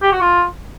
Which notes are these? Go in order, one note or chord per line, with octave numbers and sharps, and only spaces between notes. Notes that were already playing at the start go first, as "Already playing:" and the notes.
G4
F#4
F4